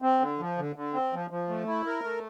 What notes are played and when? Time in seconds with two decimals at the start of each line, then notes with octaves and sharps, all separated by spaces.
0.02 C4
0.20 D3
0.39 F3
0.58 D3
0.76 D3
0.93 C4
1.13 F3
1.31 F3
1.49 A3
1.67 E4
1.86 A#4
2.04 A3